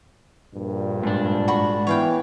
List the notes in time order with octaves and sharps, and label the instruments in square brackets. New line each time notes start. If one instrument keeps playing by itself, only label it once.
[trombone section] A#1 G2 A#2
[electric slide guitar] G#2 D4
[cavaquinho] F#4 B5 C#6
[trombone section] E3 B3 [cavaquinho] C#5 F5 G5